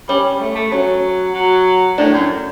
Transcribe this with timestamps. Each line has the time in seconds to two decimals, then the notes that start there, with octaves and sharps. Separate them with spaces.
0.08 G3 C#4
0.25 G3
0.41 A3
0.55 A3
0.72 F#3 C#4
1.34 F#3
1.98 A2 D4
2.14 F#2